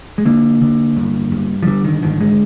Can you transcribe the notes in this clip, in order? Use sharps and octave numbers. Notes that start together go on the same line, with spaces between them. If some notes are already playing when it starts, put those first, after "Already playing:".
G#3
D3 A#3
D3
G2
G2
F3
D3 G3
D#3
G#1 D#3
G#3